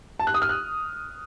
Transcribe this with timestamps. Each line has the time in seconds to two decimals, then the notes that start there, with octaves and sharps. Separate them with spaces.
0.20 A5
0.27 F#6
0.34 D#6
0.42 F6
0.49 F#6